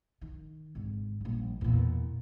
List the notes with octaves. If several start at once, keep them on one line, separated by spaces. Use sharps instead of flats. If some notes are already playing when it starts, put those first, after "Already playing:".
D#3
G#1 D3
A#1 G3
E2 A#2